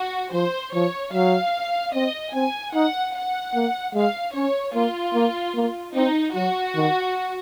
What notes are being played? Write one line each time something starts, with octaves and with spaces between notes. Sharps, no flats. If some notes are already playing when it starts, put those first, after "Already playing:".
Already playing: F#4
F3 C5
F3 C#5
F#3 F5
C4 D#5
C4 G#5
D#4 F#5
F#5
A#3
G#3 F5
C#4 C#5
A#3 F4
A#3
A#3
C4 D#4
F#3 F#4
D#3